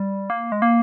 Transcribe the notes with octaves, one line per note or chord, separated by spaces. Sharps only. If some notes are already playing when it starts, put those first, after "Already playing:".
Already playing: G3
A#3
G#3
A#3